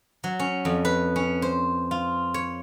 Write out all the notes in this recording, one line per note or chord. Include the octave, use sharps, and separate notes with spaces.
F#3
C#4
F2
B4
C#4
C5
F4
C#5